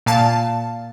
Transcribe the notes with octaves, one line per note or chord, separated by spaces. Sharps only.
A#2 F5 A5